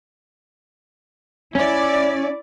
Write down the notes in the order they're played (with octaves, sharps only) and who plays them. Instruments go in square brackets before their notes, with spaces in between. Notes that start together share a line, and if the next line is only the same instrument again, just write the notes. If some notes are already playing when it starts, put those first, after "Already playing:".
[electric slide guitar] C#4 [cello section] E4 D5